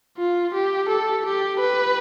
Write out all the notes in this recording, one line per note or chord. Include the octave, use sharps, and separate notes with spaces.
F4
G4
A4
G4
B4